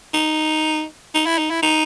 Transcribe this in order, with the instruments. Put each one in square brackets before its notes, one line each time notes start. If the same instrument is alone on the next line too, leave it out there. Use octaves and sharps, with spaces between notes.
[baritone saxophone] D#4
D#4
E4
D#4
E4
D#4